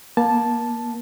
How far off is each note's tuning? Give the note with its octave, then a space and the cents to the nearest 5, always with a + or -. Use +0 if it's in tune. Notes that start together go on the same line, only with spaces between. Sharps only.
A#3 +25 A5 -5